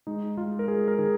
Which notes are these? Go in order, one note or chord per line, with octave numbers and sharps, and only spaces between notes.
G#3 D#4
G#3 F4
A#4
G#3 G#4
A#4
D#3 G#4